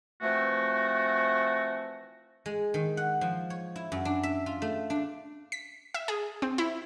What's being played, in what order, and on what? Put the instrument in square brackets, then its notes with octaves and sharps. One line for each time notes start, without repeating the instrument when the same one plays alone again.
[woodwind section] E3 F3 A3 C4 F#4
[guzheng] G#3
D#3
F#5
F3
C#5
E4
F#2
D4
E5
F4
A3
D4
[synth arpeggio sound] B6
E5
G#4
C4
E4